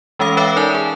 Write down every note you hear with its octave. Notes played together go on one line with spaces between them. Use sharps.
E3 G#3 C#4 A4 F5 D#6
B4 C#5 E5 F5 G5 D6
D#4 A#4 D5 G#5 A5
G#4